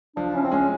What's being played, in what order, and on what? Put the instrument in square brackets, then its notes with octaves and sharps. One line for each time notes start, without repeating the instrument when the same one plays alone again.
[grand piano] F3 [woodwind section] D4
[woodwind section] C#4 [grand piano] E4
[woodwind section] C4
[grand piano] G#3 [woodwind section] C#4